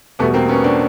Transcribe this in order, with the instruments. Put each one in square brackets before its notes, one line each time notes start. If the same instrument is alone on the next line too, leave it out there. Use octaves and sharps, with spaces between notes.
[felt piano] E2 B2 G3 [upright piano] A3 B3
[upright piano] A#3 C4
B3 C#4
C4 D4